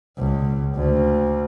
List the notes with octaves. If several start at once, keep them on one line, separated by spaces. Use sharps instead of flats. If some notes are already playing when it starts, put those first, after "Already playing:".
C#2
D2